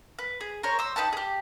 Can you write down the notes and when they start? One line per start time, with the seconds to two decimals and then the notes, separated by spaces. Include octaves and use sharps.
0.19 B4
0.41 G#4
0.63 A#4 C5 C#5
0.79 C5 E6
0.96 D#4 G4 B4 A5
1.13 G4 G#4